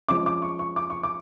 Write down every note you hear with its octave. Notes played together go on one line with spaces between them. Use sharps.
F3 G#3 C#4 D6
D6
C#6
C#6
D6
C#6
D6